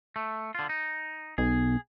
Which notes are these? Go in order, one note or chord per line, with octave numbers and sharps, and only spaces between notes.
A3
D3 F4
D#4
B1 G#4